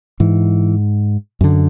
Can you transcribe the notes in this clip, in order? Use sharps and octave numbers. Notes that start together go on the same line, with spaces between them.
G#2 E3
F#2 D3